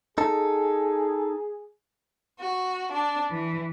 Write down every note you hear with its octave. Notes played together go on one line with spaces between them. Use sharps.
D#4 G#4 A4
F#4
D4
E3